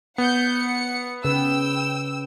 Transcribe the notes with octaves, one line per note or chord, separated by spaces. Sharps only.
B3 F#5 G6 C#7
F#5 C#7
C#3 B4 G5 E6